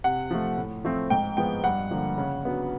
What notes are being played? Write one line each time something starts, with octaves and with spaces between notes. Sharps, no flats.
C3 F#5
F3 A3
A2
F3 A3 C4
G#2 G5
F3 G#3 B3 G5
G2 F#5
D3 F3 A#3
C#3
F#3 B3 D4